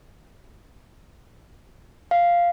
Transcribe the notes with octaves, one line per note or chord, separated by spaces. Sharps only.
F5